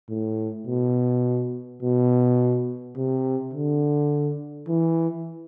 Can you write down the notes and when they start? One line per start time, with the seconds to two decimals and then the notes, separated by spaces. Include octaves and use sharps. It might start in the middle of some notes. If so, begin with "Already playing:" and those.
0.10 A2
0.67 B2
1.83 B2
2.96 C3
3.53 D3
4.68 E3